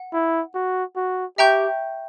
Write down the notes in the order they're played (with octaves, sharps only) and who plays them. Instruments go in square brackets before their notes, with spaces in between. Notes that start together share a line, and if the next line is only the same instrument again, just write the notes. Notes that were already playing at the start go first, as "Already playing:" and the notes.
Already playing: [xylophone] F#5
[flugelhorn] E4
F#4
F#4
[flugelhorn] G4 [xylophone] E5 G5 A#5 C#6 G6